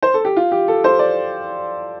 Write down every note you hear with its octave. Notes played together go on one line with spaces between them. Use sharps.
C5
A4
G4
F4
G4
A4
C5
D5